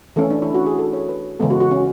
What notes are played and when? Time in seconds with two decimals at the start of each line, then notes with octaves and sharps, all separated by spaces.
0.16 E3 A3 C#4 A4
0.30 D4
0.42 E4
0.54 F#4
0.66 G#4
0.79 A4
0.93 C#5
1.09 B4
1.39 C#3 E3 G#3 B3 A4
1.50 F#4
1.61 F#4
1.71 C#4